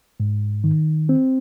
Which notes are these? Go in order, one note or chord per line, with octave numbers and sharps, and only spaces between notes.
G#2
D#3
C4